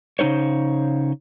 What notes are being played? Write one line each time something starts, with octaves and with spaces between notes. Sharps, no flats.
C#3 G3 D#4 C5 C#5